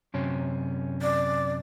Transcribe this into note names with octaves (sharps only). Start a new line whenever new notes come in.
F#2 C3 C#4
D5